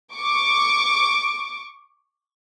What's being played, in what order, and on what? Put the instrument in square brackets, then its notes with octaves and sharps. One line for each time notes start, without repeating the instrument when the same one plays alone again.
[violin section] C#6 D6